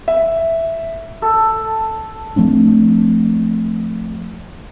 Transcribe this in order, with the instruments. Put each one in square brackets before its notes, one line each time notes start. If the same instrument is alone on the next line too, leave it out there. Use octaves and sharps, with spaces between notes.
[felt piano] E5
[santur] A4
[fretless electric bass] F3 A3 C4 D4